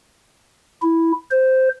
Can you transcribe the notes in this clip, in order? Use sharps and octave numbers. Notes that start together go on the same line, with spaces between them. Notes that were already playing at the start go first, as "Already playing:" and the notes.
E4
C5